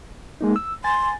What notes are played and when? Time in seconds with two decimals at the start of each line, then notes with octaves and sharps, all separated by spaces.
0.41 G#3 A#3 D#4
0.56 E6
0.84 G#5 C6 A6